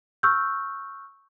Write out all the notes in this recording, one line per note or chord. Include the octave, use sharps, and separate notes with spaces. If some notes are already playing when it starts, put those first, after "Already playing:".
C#6 E6 F6 G6